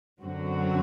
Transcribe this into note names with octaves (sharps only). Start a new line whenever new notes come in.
F#2 D3 F#3 C4 F#4